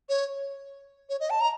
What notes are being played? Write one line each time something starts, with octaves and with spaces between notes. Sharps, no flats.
C#5
C#5
D#5
A5
A#5